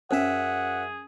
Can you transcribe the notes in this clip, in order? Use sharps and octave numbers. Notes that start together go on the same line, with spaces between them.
F#2 C#4 G#4 C5 E5 F#5